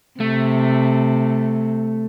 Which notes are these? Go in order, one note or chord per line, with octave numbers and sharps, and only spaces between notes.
C3 A3